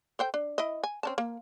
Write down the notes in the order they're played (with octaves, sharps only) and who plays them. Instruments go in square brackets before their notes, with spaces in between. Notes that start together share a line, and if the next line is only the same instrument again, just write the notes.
[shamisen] A4 C5 G5
D4
E4 D#5
G#5
C4 C#4 A5
A#3